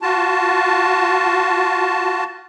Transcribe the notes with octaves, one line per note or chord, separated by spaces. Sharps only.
F4 F#4 A5